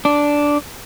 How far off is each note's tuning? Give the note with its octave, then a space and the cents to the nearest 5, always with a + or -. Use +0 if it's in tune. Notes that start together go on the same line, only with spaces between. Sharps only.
D4 -5